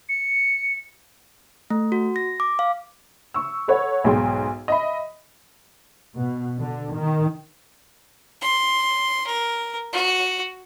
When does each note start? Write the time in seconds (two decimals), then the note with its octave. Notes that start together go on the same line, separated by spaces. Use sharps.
0.09 C#7
1.70 A3
1.92 F#4
2.16 A#6
2.40 D6
2.59 F5
3.34 C#6 E6
3.68 A4 B4 C#5 F#5
4.04 B1 G#2 G#4 G5 C6
4.68 D#5 E5 B5
6.16 B2
6.60 D3
6.95 D#3
8.42 C6
9.27 A#4
9.93 F#4